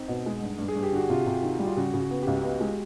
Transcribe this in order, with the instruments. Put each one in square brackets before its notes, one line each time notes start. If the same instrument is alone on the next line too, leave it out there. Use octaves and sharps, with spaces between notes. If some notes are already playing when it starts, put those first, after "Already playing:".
Already playing: [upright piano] C4 [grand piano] D#4
[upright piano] B2
G#3
G2
G2
[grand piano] G#4
[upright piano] G2
[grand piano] G4
[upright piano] D3 [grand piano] F#4
[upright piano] C3 [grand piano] F4
[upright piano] C3
D#3
G3
[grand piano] F4
[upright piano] C#3 [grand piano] F#4
[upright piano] C#3
[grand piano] F#4
[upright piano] B3
[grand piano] G4
[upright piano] C#2
B3
G#3